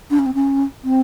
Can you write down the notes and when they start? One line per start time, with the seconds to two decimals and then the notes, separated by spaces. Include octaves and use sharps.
0.11 D4
0.19 C#4
0.26 C4
0.34 C#4
0.84 C4